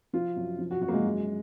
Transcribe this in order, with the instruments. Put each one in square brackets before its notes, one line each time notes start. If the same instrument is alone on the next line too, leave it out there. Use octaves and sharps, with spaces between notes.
[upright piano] F3 F4
F#2
F3
F#4
F#2 F#4
A#3
G#3
F#2